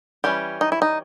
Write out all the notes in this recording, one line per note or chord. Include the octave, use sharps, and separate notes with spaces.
E3 G3 C#4 G4
D#4
E4
D#4